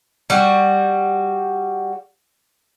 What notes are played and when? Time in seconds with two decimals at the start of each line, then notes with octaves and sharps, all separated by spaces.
0.30 G3 F#4